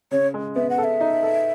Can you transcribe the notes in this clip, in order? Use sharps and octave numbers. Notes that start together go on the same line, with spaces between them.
C#3 C#5
G#3
B3 E5
F#5
A4
E5
D#4
A4